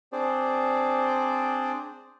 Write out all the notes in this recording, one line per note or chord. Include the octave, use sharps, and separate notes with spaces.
C4 D4 G#4 C5 D5